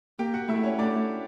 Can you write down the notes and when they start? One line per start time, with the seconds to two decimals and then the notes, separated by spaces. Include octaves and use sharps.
0.19 A#3 G4 G5
0.34 F#4 F#5
0.48 A3 E4 E5
0.63 C#4 C#5
0.79 A3 D4 D5